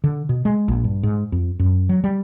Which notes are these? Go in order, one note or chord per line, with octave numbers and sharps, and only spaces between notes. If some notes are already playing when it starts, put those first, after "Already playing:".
D3
B2
G#3
A#1
G2
G#2
F2
F#2
F#3
G3